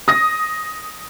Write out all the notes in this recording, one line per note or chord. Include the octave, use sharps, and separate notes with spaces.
D#6 A#6